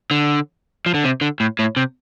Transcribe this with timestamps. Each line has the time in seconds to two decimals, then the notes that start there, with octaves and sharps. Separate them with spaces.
0.11 D3
0.86 F3
0.94 D3
1.04 C3
1.21 D3
1.40 A2
1.59 A2
1.77 C3